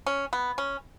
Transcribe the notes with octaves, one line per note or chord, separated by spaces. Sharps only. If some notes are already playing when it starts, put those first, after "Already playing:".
C#4
B3
C#4